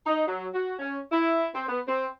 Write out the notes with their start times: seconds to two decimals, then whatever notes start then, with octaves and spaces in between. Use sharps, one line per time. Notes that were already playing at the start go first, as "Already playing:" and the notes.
0.05 D#4
0.26 F#3
0.53 F#4
0.79 C#4
1.11 E4
1.54 C4
1.67 B3
1.87 C4